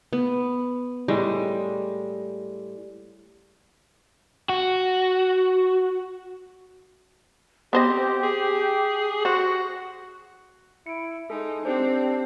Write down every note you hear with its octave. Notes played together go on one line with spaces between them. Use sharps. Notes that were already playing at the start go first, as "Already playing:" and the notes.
B3
A2 G3 G#3 D#5
F#4
B3 C4 G4 C5 D#5
G#4
F#4 C5
E4 C#7 D7
G#3 D#4 A4
C4 D4 G4 C5